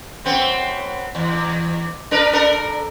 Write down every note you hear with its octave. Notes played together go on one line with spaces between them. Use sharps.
F#2 B3 C4
E2
D4 A#4 B4
D4 A4 A#4